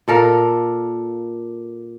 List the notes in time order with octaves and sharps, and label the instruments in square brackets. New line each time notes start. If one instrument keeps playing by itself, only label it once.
[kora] A#2 A4 A#4 F5